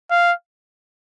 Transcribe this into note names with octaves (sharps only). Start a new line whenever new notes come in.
F5